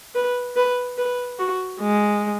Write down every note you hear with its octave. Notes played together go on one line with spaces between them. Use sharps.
B4
B4
B4
F#4
G#3